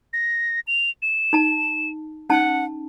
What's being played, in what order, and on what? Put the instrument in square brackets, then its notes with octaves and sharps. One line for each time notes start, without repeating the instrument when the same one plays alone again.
[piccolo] A#6
F7
E7
[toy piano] D#4 A5
[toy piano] C#4 D#4 A5 [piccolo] F#5